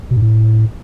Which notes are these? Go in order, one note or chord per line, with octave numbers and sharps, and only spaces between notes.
B2
G#2
A2